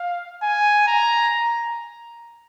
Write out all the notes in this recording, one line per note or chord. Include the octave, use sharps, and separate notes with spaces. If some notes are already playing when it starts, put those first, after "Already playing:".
Already playing: F5
G#5
A#5